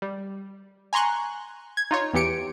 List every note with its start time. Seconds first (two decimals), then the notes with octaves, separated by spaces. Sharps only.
0.02 G3
0.93 G#5 A#5 C6 C#6 F#6
1.77 G#6
1.91 D#4 F4 C#5
2.14 E2 E3 G4 C#7 D7